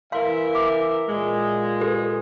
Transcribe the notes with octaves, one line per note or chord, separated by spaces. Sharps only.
E3 A#4 E5 F5 C6
D6
A#2 G#3
G4 A4 B4